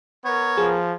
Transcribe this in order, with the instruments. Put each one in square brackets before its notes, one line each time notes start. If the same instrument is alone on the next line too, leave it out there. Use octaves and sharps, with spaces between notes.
[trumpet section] B3 A#4 [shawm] C#5
[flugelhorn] F3 [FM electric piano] G#4